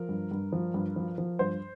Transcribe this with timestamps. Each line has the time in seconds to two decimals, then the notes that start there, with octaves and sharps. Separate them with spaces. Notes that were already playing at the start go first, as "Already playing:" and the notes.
Already playing: F3 A#4
0.09 G2
0.31 G2
0.53 F3
0.74 G2
0.96 F3
1.18 F3
1.39 G2 C5